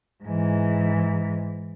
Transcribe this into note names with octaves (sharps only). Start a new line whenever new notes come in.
G#2 E3